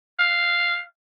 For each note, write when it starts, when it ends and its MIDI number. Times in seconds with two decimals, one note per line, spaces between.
0.19 0.83 77